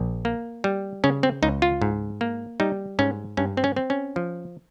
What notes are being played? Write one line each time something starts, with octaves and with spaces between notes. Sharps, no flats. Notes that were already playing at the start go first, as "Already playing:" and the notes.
Already playing: A#1
A#3
G3
C#3 C#4
C4
C#2 D#4
F4
G#2
A#3
G3 D#4
G#2 C#4
G2 C#4
C4
C#4
C4
C#4
F3